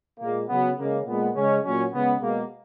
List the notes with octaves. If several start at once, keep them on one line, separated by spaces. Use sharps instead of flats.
A#2 G#3 A#3
C#3 F#3 B3
C#3 G#3 A#3
A#2 G#3 B3
C#3 G#3 C#4
A#2 F#3 C#4
C#3 G#3 B3
B2 G#3 A#3